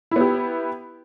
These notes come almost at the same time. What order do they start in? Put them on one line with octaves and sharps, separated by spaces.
E4 B3 G4